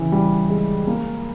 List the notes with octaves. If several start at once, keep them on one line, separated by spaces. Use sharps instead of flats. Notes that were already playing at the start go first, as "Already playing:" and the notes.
Already playing: C#3 E3
G3
G#3
A#3